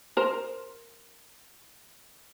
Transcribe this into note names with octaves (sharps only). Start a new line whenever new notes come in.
A#4 C5